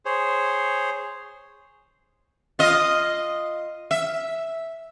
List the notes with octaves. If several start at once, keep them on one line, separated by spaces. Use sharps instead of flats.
G#4 C5 C#5
F4 D#5
E5